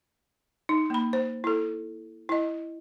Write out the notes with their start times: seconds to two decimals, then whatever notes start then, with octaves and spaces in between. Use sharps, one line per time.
0.69 D#4
0.90 A#3 B5
1.13 C5
1.44 E4 A4
2.29 E4 D#5